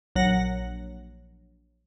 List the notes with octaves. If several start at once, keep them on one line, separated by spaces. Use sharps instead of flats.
A#1 F#3 F#5 A#6